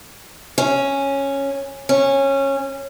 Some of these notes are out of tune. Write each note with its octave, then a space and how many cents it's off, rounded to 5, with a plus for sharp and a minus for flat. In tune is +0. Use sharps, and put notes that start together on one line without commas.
C#4 -5
C#4 -15